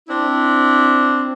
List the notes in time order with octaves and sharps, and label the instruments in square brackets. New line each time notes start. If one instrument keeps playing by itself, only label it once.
[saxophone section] C4 D4 E4